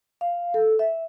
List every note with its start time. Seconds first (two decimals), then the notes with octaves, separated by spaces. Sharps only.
0.21 F5
0.54 A4
0.79 E5